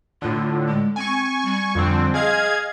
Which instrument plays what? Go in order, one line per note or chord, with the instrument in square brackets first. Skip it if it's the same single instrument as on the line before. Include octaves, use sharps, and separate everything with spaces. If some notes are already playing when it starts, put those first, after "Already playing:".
[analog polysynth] A2 D3 [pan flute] F4
[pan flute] G#3
[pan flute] C4 [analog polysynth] G#5 C#6
[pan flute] G3
[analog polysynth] F2 D3 C4
[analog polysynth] G#4 F5 G#6 [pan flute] D#5